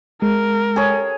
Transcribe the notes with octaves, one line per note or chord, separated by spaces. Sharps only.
G#3 A#4
G#4 A4 C#5